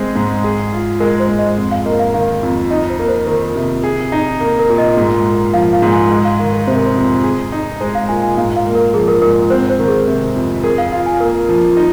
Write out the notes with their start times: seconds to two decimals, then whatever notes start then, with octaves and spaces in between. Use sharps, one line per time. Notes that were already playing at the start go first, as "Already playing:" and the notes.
Already playing: G#3 C4 G#4
0.16 G#2
0.44 G#4
0.72 F4
1.00 G#3 A#4
1.20 C5
1.29 G#2
1.39 D#5
1.57 F2
1.71 F5
1.85 A#3 D#5
1.99 F5
2.14 D#3 F5
2.43 F2
2.70 D#4 D#5
2.90 C5
2.99 A#3
3.09 C5
3.27 D#3 A#4
3.56 C3
3.84 G#4
4.12 D#4
4.40 A#3
4.59 A#4
4.69 A#2
4.78 D#5
4.97 G#2
5.25 A#3
5.54 F3 F5
5.73 F5
5.82 G#2
5.92 G#5
6.11 G#3
6.25 F5
6.39 D#3 F5
6.53 A#4
6.67 C3 C5
6.76 A#4
6.86 C5
6.95 F2
7.24 G#4
7.52 D#4
7.80 G#3 C5
7.95 F5
8.09 A#2 G#5
8.23 G#5
8.37 G#2 F5
8.56 F5
8.66 A#3
8.75 A#4
8.94 F3 G#4
9.08 A#4
9.22 G#2 A#4
9.50 C4 C5
9.70 C5
9.79 D#3
9.88 G#4
10.07 C3
10.36 F2
10.64 G#4 A#4
10.78 F5
10.92 F4 F5
11.06 G#5
11.20 A#3 A#4
11.49 F3
11.77 D#4